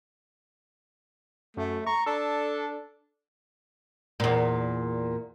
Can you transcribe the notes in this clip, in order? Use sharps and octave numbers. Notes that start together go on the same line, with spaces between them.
F#2 A3
A#5 C#6
D4 A4
E2 A#2